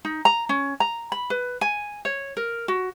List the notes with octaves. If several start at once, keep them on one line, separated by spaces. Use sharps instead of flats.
D#4
A#5
C#4
A#5
B5
B4
G#5
C#5
A#4
F#4